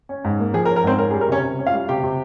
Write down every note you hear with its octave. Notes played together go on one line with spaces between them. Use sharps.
C#4
G#2
A#3
F3 G#4
A#4
C#4
A#4
G#2 C4 C5
C#4 A#4
G#4
G3
A#4
C3 C#4 C#5
C3
C#4
F4 F5
G3
C3 G4 G5
C3